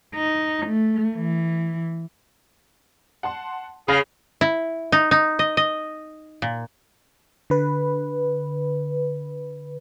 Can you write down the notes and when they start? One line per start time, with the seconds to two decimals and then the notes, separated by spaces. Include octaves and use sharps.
0.15 D#4
0.67 A3
1.16 E3
3.23 F#5 A5 C6
3.88 C#3 G#4 B5 F6 A#6
4.41 E4
4.92 D#4
5.11 D#4
5.39 D#5
5.57 D#5
6.42 A#2
7.50 D3 B4